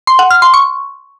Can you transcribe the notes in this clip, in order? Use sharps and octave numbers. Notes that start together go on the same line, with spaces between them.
C6
F#5
F6
C6
C#6